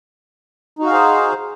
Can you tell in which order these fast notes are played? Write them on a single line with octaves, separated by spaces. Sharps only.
D#4 F#4 F5 G#4 C5